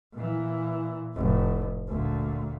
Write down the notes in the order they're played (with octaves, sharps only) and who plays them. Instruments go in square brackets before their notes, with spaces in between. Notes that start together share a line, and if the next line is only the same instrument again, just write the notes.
[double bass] A#2 E3
F1 A2
D2 A#2